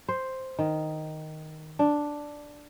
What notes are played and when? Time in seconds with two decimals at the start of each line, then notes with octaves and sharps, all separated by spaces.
0.08 C5
0.59 D#3
1.79 D4